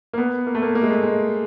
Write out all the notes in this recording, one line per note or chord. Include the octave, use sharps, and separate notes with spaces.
A#3
B3
A#3
A3
A#3
A#3
G#3
A3
G#3